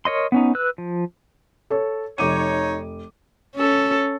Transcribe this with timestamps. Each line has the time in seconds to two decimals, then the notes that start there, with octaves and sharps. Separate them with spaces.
0.05 A#4 C#5 D#5 C6
0.32 B3 C#4 D#4
0.55 B4 E6 F#6
0.78 F3
1.70 A4 C#5
2.18 F1 D#4 C#5 D6 D#7
3.56 C#4 A4